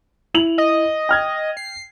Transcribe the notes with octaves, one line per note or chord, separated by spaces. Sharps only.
E4 F7 F#7
D#5
G5 F6 G#6
C7